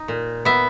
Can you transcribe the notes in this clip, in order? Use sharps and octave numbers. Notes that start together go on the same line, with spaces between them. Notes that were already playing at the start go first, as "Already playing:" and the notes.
Already playing: D#4
A#2
B3 E5